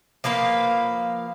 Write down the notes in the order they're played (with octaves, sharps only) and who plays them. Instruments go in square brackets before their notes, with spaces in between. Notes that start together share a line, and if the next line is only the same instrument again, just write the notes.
[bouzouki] F3 A#3 B4 F5